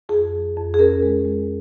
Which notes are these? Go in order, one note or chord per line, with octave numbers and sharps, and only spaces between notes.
F2 G#4
F3
F2
G#4
C#4 A#4
G#3
G#3